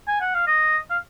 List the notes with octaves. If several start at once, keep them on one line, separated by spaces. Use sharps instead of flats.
G#5
F#5
F5
D#5
F5